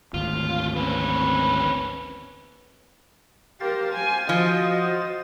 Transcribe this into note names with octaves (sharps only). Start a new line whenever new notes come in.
G#1 D2 F4
C4 C#4 B4
G4 A#4 C5 F5 A6
G#5
F3 F#4 D#5